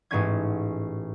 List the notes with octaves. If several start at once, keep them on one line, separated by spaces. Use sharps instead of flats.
A1 G#2 C#4 G#6